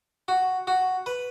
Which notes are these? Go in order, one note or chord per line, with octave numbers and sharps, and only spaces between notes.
F#4
F#4
B4